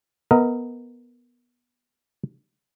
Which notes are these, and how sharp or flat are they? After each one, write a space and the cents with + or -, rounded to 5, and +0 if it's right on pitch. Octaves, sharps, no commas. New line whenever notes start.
B3 -15 A#4 -15 D#5 +30